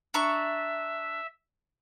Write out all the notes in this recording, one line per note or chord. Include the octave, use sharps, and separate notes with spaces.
D4 E5 A#5 C#6